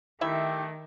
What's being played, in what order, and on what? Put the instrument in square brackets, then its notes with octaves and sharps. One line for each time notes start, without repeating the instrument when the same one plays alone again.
[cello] D#3 [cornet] A3 [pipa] E4 E5 [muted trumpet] G4